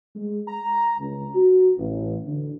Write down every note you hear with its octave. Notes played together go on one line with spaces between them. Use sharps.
G#3
A#5
C#2
F#4
A1
D3